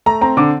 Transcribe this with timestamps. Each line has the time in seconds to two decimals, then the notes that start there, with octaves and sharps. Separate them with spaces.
0.06 A3 A#5
0.21 C4 A#5
0.37 D3 D6